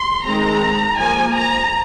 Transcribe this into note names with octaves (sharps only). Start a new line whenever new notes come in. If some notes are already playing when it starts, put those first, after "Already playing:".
Already playing: C6
D#3 G#3 C4 A#5
F3 A#3 G#5
A#5